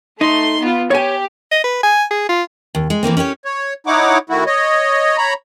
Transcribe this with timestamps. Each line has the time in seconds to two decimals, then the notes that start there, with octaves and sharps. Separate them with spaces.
0.21 A3 D#4 C6
0.60 B3 F4
0.91 G4 C#5 G#5
1.52 D#5
1.64 B4
1.83 G#5
2.11 G#4
2.29 F4
2.75 D#2
2.90 G#3
3.03 E3 A3 A#3 C4
3.17 C#4 E4 G4 C#5
3.45 C#5
3.87 D#4 E4 C#5 F#5 D6
4.30 D#3 A3 E4 F#4
4.46 C#5 D#5
5.18 C#5 A#5 B5